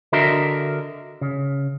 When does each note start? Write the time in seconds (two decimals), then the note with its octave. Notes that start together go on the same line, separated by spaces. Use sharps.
0.13 D3 D4 F#4 A#4 D#5 E5
1.21 C#3